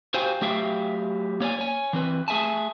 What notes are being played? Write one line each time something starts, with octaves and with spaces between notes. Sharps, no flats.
F#4 G4 C5 F5 G5 G#5
F#3 A3 G4 E5 F5 G5
A#3 C#5 D5 G#5
C#5 G#5
E3 C4 B4
A3 G#4 E5 G#5 A5